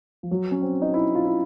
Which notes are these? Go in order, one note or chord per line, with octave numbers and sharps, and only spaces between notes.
F3
F#3
C#4
C4
D#4
E4
F4
E4